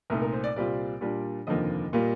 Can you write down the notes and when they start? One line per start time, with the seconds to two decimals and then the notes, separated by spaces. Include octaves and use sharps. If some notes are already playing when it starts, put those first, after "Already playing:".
0.10 C2 A#2 A3 D#4 A#4
0.22 A#4
0.33 C5
0.44 D5
0.56 C2 A#2 G3 C4 F4 D5
1.01 A#2 G3 D4 F4
1.47 F1 D#2 D3 F3 A#3 D#5
1.93 A#2 G3 A#3 F4